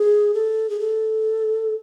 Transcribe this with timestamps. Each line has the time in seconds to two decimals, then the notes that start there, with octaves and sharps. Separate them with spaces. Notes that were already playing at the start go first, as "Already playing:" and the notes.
Already playing: G#4
0.34 A4
0.70 G#4
0.80 A4